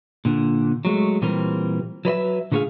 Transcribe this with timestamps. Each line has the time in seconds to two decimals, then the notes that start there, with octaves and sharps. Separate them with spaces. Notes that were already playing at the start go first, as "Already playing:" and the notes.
0.25 A#2 D3
0.85 F#3 G#3 A3
1.22 A#2 E3 G3 C4 A#4
2.05 F#3 B4 D5 E5
2.52 A#2 D3 A3 E4 G#4 F5